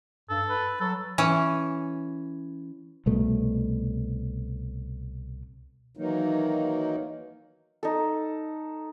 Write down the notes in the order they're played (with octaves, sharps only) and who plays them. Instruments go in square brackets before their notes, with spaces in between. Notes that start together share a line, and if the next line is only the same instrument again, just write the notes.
[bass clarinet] G2 [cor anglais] A4
[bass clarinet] B4
[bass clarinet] F#3 [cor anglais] A4
[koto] E3 C#4
[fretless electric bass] C2 B2 A3
[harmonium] D#3 E3 F#3 A#3 D#4
[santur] D#4 A4